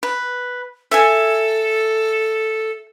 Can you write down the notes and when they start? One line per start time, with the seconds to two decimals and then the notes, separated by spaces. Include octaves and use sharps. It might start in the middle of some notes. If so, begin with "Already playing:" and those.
0.03 B4
0.91 A4 E5 G#5